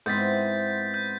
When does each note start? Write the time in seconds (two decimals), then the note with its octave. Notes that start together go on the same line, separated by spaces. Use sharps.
0.06 G#2 B3 C4 E4 G6 A6 B6
0.94 G6